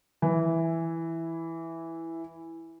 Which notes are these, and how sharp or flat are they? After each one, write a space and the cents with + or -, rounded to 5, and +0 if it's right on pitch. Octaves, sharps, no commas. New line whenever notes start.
E3 +0 E4 +0